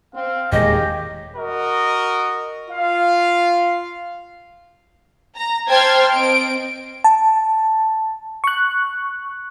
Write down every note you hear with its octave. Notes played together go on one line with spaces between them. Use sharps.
C4 F5
D#1 E2 D#3 G#3 C#4 G4 G#4 D#5
F#4 A#4 D#5
F4 F5
A#5
C5 G5 A5 C6 F6 G#6
C4 D#5 D7
A5
C#6 F#6